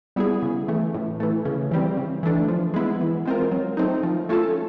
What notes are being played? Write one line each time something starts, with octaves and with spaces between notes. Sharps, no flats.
G3 B3 E4 G#4
C#3
E3 A3
A2
E3 A3
C#3
E3 G3 C4
C#3
E3 A3 D4
F3
G#3 B3 E4
E3
G#3 C4 F4 A#4
F#3
A3 C4 D#4
F3
A3 C#4 F4 A4